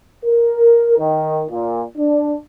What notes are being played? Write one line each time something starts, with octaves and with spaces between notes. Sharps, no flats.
A#4
D#3
A#2
D4